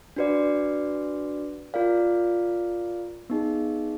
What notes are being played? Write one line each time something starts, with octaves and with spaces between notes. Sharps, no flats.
D4 F#4 B4 D5
F4 A#4 D5 F5
B3 D#4 G#4